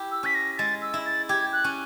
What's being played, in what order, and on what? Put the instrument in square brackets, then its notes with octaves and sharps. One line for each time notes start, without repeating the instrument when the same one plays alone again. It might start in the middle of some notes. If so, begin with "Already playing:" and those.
Already playing: [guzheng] E4 G4
[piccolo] E6
[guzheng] C#4 [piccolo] B6
[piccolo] A#6
[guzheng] G#3 [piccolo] A6
[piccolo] E6
[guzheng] E4
[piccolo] A6
[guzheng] G4 [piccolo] G#6
[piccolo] F#6
[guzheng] C#4